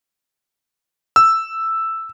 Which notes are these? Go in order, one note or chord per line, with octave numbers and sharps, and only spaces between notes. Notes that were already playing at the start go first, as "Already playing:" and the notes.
E6